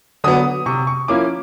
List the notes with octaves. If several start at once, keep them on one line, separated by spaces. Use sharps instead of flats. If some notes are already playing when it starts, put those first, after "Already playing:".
D3 F#3 B3 D#6
C3 C#6
C#6
F3 A#3 C#4 E4 D6